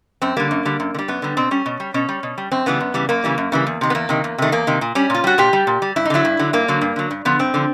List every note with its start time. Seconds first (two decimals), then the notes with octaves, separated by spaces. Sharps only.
0.22 F#2 C4
0.37 D3 G3 A#3
0.51 F#2
0.65 D3 G3
0.80 F#2
0.94 D3
0.99 G3
1.08 F#2 B3
1.22 D3 G3
1.37 B2 C4
1.51 G3 C#4
1.66 B2
1.80 G3
1.94 B2 C#4
2.09 G3
2.23 B2
2.38 G3
2.52 F#2 C4
2.66 C#3 E3 G3 B3
2.80 F#2
2.94 C#3 E3 G3
3.09 F#2 A#3
3.24 C#3 E3 G3
3.38 F#2
3.52 C#3 E3 G3
3.67 E2
3.81 C3 D#3
3.90 B3
3.95 E2 A#3
4.09 C3 D#3
4.24 E2
4.38 C3 D#3 A3
4.52 E2 A#3
4.67 C3 D#3
4.81 A#2
4.95 G3 C#4
5.10 A#2 F4
5.24 G3 F#4
5.38 A#2 G4
5.53 G3
5.67 A#2
5.82 G3
5.96 G2 E4
6.05 D#4
6.10 D3 F#3 E4
6.25 G2
6.39 D3 F#3
6.53 G2 A#3
6.68 D3 F#3
6.81 G2
6.96 D3 F#3
7.11 G2
7.25 D3 F3 B3
7.39 G2 C4
7.54 D3 F3